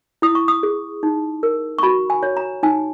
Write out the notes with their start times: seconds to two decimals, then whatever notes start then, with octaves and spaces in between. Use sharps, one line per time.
0.22 E4 D#6
0.35 C#6
0.48 D#6
0.63 G#4
1.03 D#4
1.43 A#4
1.79 C#6
1.83 F#4 B5
2.10 G#5
2.23 C#5
2.37 A#5
2.63 D#4 G#5